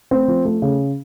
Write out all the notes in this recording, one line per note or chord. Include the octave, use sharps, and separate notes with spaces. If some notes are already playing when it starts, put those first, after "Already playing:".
A3 C4
F3
A3
C#3